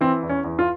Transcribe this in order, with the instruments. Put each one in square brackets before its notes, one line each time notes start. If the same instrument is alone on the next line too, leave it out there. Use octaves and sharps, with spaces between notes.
[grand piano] E3 C4
E2
C#4
E2
F4